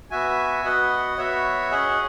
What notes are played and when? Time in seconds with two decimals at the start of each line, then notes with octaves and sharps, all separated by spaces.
0.11 B3 F#4 E5 G#5
0.64 B3 F#4 D#5 F#5
1.17 B3 F#4 C#5 E5
1.71 C#4 G#4 D#5 F#5